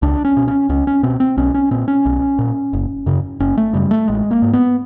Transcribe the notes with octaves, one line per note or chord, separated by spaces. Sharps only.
C#2 D4
C#4
B2
C#4
C#2 C#4
C#4
B2 C4
C4
B1 C#4
C#4
A#2 C4
C#4
B1
A#2
F#1
F#2 C#3
F#1 C#4
A3
F#2 C#3 G3
A3
A1 G#3
A#3
G#2
B3